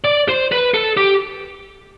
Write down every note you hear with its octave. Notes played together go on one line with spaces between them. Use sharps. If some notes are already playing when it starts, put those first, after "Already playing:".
D5
C5
B4
A4
G4